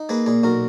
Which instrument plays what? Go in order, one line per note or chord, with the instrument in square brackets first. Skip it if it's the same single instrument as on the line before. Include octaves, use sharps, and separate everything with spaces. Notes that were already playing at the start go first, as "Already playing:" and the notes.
Already playing: [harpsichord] D#4
A#3 G#4 B4
A#2 G#4
B1 F#4 A#4